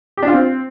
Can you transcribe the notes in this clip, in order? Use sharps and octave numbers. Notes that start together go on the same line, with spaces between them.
G4
D4
F4
C4